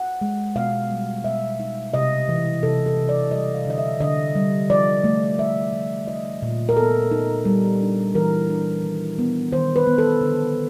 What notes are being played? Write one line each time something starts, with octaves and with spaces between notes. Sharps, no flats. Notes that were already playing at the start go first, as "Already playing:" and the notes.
Already playing: F#5
G#3
B2 F5
G3
B2 E5
D#4
C3 D#5
E3
C3 A4
A4
C3
D5
G3 D#5
F5
D3 D#5
E5
D3 D#5
G3
F3 D5
A3
A3 E5
F3
D#4 D#5
A#2
A#4
B3 A4
D#4
G3
D4
E3 A#4
D4
D#3
B3
D#3 C5
B4
B3
A4
D3